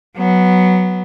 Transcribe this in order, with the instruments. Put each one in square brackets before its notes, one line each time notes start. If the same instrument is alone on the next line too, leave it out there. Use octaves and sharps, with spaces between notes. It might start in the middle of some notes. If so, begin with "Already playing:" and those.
[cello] F#3 B3